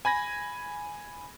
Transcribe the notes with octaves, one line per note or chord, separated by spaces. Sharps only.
G#5 B5 G#6 A#6